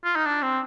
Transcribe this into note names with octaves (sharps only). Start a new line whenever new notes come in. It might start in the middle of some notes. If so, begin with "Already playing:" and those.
F4
D#4
D4
C4